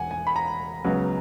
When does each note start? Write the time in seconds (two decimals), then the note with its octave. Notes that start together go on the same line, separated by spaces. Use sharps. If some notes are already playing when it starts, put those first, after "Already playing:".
Already playing: E1 F#5 G#5
0.11 G#5
0.27 B5
0.36 A#5
0.84 C#2 C#3 F#3 B3